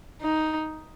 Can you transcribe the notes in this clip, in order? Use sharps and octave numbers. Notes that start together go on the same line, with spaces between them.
D#4